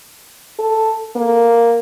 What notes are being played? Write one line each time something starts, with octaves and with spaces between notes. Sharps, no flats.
A4
A#3